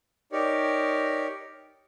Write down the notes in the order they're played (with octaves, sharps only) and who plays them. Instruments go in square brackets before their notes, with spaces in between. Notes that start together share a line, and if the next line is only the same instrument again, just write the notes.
[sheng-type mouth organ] D#4 G4 A#4 C#5 D5